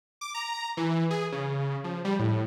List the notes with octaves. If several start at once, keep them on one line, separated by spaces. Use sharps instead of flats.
D6
A#5
E3
G#4
C#3
F3
G3
A2